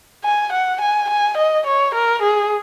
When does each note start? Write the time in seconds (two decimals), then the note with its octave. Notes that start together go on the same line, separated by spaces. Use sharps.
0.24 G#5
0.53 F#5
0.81 G#5
1.10 G#5
1.38 D#5
1.67 C#5
1.95 A#4
2.23 G#4